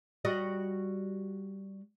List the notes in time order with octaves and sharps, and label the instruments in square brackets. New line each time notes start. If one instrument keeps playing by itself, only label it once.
[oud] G3 F#4 D#5